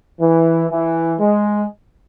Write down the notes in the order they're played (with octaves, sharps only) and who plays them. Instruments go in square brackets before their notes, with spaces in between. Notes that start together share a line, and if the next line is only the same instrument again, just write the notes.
[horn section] E3
E3
G#3